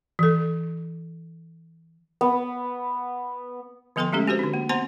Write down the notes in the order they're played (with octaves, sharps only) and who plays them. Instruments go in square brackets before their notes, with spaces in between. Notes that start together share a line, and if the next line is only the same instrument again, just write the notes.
[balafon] E3 A4
[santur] B3
[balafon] D3 F3 B3 A4 G5 C6
G#3 A3 C#4 G4 A4
C4 F#4 G4 B4 C5
D3 D4
A#3
B3 C4 C5 F#5 A#5 C6